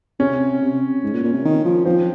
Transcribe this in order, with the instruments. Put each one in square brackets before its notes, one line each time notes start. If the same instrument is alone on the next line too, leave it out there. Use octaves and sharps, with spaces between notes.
[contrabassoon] C3 [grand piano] C#4
[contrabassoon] C3
G#2
A#2
A#2
C3
D#3
F3
[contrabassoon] F3 [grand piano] C4